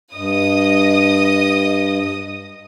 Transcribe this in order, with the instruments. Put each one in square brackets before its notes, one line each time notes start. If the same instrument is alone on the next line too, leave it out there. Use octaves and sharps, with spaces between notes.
[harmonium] G2 [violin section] D#5 D#6